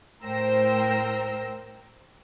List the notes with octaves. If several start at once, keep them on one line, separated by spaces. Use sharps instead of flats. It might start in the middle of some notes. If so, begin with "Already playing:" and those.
A2 A#4 C5 G5 E6 A#6